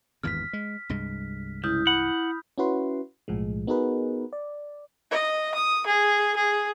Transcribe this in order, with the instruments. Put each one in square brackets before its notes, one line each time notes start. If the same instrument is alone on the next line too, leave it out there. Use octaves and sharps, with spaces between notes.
[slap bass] G#1 E2 G2 [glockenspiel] F6 B6
[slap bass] G#3
C2 G2 G#3
[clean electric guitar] C#2 [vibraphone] E4 [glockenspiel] D#6 F6 G6
[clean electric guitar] F#5 [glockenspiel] B5
[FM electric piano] C#4 E4 F#4 B4 C6
B1 A2 F3 G#3
B3 D#4 F#4 G#4 A#4 B4
D5
[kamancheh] D#5
D#6
G#4
G#4